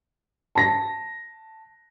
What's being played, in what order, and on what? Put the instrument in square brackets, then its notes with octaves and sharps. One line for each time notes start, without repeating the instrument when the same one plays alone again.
[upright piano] A5 A#6